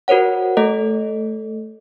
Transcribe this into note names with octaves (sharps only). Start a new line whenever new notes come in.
F#4 A#4 C5 C#5 F#5
A3 A4 D#5